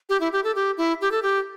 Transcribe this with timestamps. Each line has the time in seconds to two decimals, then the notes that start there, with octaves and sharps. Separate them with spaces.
0.09 G4
0.21 E4
0.33 G4
0.44 A4
0.55 G4
0.77 E4
1.01 G4
1.12 A4
1.23 G4